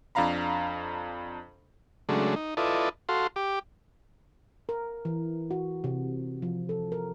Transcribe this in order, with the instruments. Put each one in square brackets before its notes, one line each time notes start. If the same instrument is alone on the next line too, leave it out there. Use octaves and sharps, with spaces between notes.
[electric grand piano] F2 D4 F5 A#5 B5
[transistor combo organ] C#3 F#3 G#3 A3 D4
D#4
E4 F4 A4 B4 D5 D#5
F#4 A4 F5 C6
G4 D6
[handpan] A#4
E3
F#4
C3
F3
A4
A#4